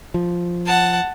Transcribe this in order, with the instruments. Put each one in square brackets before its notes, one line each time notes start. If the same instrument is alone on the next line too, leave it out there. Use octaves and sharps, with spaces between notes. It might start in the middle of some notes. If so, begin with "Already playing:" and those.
[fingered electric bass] F3
[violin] F#5 A5